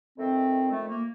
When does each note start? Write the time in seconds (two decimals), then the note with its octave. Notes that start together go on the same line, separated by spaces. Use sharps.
0.17 F2 D#3 A3 C4
0.70 A3
0.88 A#3